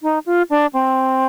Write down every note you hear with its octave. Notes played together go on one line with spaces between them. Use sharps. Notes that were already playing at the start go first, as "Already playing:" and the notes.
D#4
F4
D4
C4